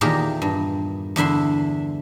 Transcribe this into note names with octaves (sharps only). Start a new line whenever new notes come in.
E2 A#2 D#3 G4 G#4 A#4
G2
E2 D3 E5 B5 C6